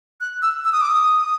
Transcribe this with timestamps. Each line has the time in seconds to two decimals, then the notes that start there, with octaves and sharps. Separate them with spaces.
0.21 F#6
0.42 E6
0.65 E6
0.72 D#6
0.81 D6
0.89 D#6